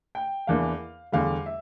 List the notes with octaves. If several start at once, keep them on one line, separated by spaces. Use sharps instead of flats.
G5
E2 E3 A#3 D4 F5
E2 D3 G3 F5
E5